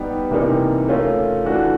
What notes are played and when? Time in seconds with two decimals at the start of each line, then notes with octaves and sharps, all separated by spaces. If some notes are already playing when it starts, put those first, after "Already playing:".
Already playing: G3 B3 D#4 G4 B4
0.31 C3 E3 G3 A#3 D#4
0.88 A3 C#4 F4 A#4
1.45 E3 A3 D4 F#4 A4